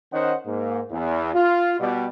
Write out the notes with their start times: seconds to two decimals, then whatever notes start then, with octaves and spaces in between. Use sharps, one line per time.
0.13 D#3 C#4 C5 D#5 F#5
0.46 G#2 A#3
0.92 E2
1.35 F4
1.80 B2 G3